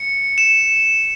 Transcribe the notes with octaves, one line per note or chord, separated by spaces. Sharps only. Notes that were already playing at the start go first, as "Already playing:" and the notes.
Already playing: C#7
E7